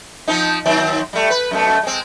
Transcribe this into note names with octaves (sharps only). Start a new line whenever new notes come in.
F3 C4 D#4
D#3 F#3 C4
G3 A3
B4
F#2 B2 A3
G#3 C4